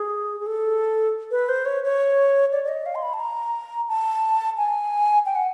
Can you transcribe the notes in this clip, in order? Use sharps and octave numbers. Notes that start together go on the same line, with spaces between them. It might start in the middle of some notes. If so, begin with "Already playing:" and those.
Already playing: G#4
G#4
A4
B4
C5
C#5
C#5
D5
D5
D#5
F5
C6
B5
A5
A#5
A5
G#5
G5
F#5